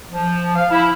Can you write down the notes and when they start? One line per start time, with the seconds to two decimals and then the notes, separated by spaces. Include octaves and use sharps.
0.12 F3
0.56 F5
0.71 E4